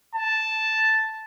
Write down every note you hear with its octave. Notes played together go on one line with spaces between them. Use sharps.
A5